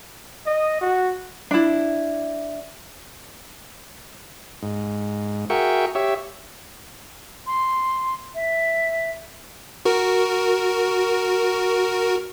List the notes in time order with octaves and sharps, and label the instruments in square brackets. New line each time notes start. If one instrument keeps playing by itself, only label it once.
[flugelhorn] D#5
F#4
[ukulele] D4 E4
[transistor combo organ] G#2
F#4 G#4 A#4 E5 G5 C#6
G4 C#5 E5
[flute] C6
E5
[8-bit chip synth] F#4 A#4